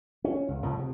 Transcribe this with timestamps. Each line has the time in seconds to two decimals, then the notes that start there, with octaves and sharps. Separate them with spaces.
0.24 C#4
0.48 C#2
0.62 C2 A2 C#3 F3
0.79 C3